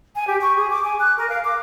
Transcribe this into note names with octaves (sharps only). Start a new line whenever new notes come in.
G#5
G4
C#6
G#4
D6
G#5
F#6
A#4
F5
D6